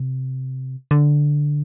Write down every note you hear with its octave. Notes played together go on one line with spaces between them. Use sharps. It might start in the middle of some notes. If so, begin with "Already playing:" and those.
Already playing: C3
D3